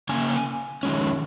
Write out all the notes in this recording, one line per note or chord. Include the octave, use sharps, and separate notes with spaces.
C#3 A#3 C#4 G#5
D#3 G#3 C#4